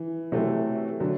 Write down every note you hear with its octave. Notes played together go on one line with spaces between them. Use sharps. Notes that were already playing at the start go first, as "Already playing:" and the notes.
Already playing: E3
C3 E3 F#3 A3
D3 F#3 A3